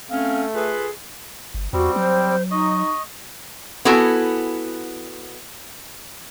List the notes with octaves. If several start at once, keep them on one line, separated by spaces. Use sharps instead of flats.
A3 C4 C#4 F5
F4 G#4 A4 B4
G1
E2 G3 C4 F#4
F#3 C5
D#4 D#5 C#6
B3 E4 F#4 A4 G#5